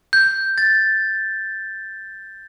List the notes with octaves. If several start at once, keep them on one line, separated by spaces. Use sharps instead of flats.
G6
A6